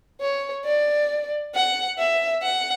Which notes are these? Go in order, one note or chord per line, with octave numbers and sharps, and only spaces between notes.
C#5
D5
F#5
E5
F#5